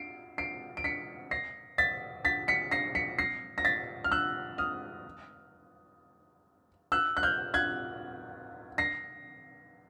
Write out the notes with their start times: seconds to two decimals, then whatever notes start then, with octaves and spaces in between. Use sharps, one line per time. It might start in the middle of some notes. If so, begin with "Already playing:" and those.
Already playing: C7 D7
0.38 C7 D7
0.77 D7
0.84 B6 C#7
1.31 A#6 C7
1.78 A6 B6
2.25 A6 B6
2.48 B6 C#7
2.71 A#6 C7
2.95 B6 C#7
3.19 A#6 C7
3.58 A#6
3.65 A6 B6
4.04 F6
4.11 E6 F#6
4.58 D#6 F6
6.92 E6 F#6
7.17 F#6
7.23 F6 G6
7.54 F#6 G#6
8.78 A#6 C7